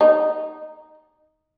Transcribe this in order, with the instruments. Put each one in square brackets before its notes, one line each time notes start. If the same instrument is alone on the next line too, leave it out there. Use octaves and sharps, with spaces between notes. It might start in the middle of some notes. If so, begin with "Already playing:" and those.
[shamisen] D#4